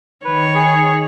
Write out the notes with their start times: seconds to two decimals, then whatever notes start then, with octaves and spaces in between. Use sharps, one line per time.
0.25 D#3 B4 C#5
0.55 G#4